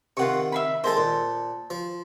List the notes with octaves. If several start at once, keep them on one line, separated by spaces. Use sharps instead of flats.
C3 D#3 F4 F#5 C#6
E5 F5 B5
D#3 G#3 A4 C5 A5
A#2
F3